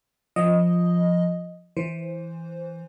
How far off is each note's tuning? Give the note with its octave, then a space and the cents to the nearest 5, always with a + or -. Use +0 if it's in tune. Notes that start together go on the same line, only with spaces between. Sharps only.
F3 +0 D#5 +0
E3 +0 C5 +0